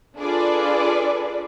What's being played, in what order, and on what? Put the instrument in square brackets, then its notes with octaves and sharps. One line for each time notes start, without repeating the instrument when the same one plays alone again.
[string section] D4 F4 G#4 A4 B4 D5